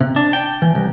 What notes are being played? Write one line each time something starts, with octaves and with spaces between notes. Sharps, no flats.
C3
D4
G5
E3
C2